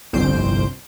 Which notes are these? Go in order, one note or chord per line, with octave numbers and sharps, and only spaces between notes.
G1 C2 F2 C5 G6 D7